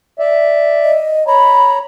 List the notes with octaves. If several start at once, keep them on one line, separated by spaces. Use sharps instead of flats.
D5 E5
D#5
C#5 A#5 B5